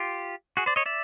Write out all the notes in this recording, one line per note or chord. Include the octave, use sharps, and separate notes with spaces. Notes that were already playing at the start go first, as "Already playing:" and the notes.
Already playing: F4 G4
F#4 G#4
C5 D5
C#5 D#5
D5 E5